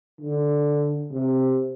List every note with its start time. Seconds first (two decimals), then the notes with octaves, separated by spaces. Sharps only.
0.21 D3
1.11 C3